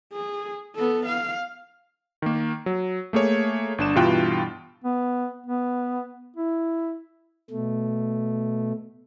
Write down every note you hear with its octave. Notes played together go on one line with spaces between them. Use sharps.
G#4
B3 A4
F5
D#3 A#3
F#3
A3 A#3 G#4 C#5
G1 D4 E7
G2 B2 E3 F4 G5 F#6
B3
B3
E4
B2 A3